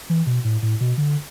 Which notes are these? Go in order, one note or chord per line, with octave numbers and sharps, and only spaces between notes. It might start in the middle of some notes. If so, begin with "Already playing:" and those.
E3
B2
A2
A2
B2
D3